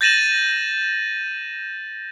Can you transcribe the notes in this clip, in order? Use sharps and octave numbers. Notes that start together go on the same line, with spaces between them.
G6 A6 A#6 D#7 E7 F#7